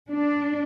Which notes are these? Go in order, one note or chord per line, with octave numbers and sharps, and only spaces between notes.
D4